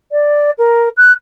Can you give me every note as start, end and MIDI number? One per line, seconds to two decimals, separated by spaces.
0.12 0.51 74
0.58 0.89 70
0.97 1.12 90